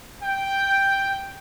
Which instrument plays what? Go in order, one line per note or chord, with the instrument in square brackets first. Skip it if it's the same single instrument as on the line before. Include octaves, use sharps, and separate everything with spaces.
[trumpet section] G5